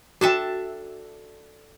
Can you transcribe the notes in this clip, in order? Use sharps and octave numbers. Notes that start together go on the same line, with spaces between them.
D4 F#4 A4 E5 G5